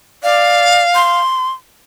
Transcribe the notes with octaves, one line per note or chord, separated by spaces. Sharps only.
D5 F5
C6